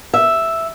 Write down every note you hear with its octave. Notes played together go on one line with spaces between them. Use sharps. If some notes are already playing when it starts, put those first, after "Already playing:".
E5